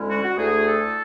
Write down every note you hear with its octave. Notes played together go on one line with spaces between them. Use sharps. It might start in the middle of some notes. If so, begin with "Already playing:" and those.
Already playing: D2 D3 G#3 C#4 E4
F#4
F#4
D2 D3 A3 E4 G#4
A4